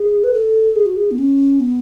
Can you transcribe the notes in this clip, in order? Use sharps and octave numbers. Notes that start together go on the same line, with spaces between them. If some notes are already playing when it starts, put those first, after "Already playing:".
Already playing: G#4
B4
A4
G#4
F#4
G#4
B3
C#4
B3